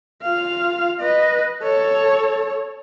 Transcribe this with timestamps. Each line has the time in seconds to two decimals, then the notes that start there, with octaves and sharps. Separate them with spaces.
0.23 F4 F5
1.00 B4 D#5
1.63 A4 C#5